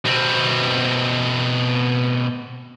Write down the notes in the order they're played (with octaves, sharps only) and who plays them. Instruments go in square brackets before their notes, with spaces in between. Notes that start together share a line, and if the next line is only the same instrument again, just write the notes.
[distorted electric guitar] B2 C4